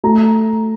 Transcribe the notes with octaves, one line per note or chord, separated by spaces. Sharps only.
A3 A#5